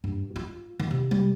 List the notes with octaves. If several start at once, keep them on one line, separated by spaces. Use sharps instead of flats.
G2
F4
D#3
C3
G3